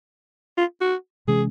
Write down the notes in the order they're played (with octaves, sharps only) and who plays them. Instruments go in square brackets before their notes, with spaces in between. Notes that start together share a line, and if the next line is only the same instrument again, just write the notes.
[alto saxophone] F4
F#4
[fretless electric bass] C3 E3 G#3 C#4 [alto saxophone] G#4